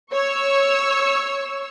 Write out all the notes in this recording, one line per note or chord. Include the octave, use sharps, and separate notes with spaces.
C#5 C#6 E6